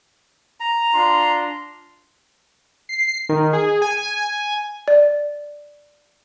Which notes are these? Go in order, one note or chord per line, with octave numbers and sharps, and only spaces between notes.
A#5
D4 F4 C6
C7
D#3
G#4
G#5
D5